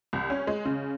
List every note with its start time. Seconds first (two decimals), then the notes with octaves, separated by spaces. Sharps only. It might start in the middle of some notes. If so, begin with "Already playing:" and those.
0.13 C2
0.30 C#4
0.47 G#3
0.65 C#3